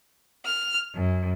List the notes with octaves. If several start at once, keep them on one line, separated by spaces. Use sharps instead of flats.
F6
F#2